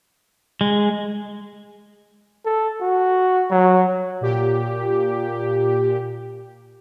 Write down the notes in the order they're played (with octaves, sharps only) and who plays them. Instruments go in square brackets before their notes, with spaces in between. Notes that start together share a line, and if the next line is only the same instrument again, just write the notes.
[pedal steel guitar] G#3
[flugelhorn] A4
F#4
F#3
[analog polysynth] A#2 G4